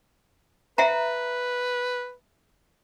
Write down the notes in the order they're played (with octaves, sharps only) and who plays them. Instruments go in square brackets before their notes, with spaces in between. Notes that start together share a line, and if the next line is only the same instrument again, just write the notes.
[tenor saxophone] B4 [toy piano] E5 F#5 A#5